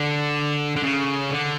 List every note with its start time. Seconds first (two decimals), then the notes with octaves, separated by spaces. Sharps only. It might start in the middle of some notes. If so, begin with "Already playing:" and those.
Already playing: D3
0.76 D3
0.83 C#3
1.30 D3